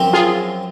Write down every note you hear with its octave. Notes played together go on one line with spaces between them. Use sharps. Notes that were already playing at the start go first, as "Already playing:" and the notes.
Already playing: F#2 F3 C4
F4 G#4